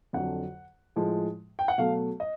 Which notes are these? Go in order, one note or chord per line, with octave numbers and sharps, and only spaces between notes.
F2 D3 F#3 F#5
A2 F3 G#3
G5
F#5
B2 F#3 A3 F5
D#5